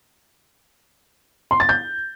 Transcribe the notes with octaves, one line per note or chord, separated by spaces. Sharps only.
C6
A6
G6